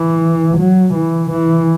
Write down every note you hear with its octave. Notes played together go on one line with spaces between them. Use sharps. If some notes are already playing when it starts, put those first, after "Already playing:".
Already playing: E3
F#3
E3
E3